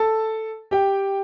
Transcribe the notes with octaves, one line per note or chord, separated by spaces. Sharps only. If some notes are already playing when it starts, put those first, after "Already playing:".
Already playing: A4 A5
G4 G5